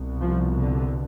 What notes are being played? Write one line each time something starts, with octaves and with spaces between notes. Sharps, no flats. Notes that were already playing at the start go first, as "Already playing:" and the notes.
Already playing: C2 B2
F3
D3